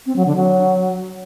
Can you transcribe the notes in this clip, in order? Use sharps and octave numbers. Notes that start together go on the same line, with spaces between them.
C4
F#3
D3
F#3